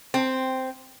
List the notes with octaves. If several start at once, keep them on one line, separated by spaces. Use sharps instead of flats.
C4